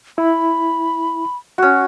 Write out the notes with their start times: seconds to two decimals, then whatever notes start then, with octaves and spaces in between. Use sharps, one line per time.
0.18 E4 B5
1.58 C#4 F#4